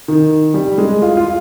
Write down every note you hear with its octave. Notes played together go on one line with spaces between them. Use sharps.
D#3
G3
G#3
F4
F4